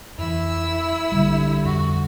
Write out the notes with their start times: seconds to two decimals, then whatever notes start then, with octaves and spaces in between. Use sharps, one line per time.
0.18 F2 E3 E4 E6
1.12 A#1 D3 G3
1.65 F2 F#4